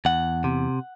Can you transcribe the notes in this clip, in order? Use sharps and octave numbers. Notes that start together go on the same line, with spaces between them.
E2 F#5
C3